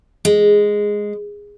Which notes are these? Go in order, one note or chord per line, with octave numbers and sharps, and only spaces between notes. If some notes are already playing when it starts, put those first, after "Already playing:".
G#3